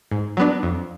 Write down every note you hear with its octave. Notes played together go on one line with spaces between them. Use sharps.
G#2
F#3 B3 D4
F2